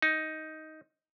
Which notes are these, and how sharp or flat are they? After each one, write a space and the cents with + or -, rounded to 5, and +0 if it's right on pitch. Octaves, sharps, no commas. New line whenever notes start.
D#4 +10